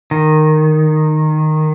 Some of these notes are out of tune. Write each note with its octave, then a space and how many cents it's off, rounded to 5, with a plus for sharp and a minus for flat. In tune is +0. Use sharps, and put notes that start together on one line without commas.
D#3 -10